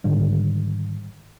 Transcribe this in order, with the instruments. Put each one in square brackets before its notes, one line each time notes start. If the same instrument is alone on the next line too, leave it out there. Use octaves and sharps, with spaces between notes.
[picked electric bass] G#2 D3 D#3 G3